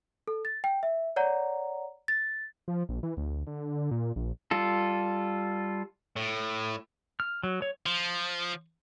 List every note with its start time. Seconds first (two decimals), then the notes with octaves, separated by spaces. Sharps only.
0.28 A4
0.45 A6
0.64 G5
0.83 E5
1.16 C#5 D5 F#5 A#5
2.08 A6
2.68 F3
2.89 A#1
3.03 E3
3.17 D2
3.47 D3
3.91 A#2
4.16 A#1
4.51 G3 F4 A4
6.16 A2
7.20 F6
7.43 F#3
7.62 C#5
7.86 F3